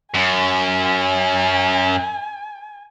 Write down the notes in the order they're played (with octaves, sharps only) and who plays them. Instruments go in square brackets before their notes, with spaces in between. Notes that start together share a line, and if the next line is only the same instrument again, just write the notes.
[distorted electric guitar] F#2 [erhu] G#5